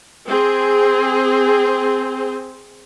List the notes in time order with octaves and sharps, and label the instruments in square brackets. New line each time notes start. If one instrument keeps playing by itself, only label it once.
[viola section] C4 G#4